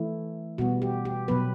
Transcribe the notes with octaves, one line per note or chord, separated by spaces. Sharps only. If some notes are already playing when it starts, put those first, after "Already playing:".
Already playing: E3 A3 E4
B2 G3 B3 F#4
G4
G4
B2 F#3 B3 B4